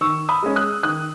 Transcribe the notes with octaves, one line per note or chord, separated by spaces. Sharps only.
D#3 C#6 E6
B5 D#6
G#3 C#4
D#6 F#6
D#3 D#6 F#6